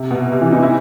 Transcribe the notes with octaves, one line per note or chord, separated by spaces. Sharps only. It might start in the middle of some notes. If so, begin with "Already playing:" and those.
Already playing: C3
B2
C3
E3
D#4
E4